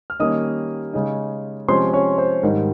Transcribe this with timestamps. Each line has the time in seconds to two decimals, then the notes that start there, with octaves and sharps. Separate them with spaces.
0.10 F6
0.20 D#3 G3 A#3 C#4 D#5 D#6
0.93 C#3 G#3 D#4
1.68 C3 F3 G#3 C#4 C5 C6
1.93 C#4 C#5
2.18 C5
2.43 G#2 D#3 G3 A#4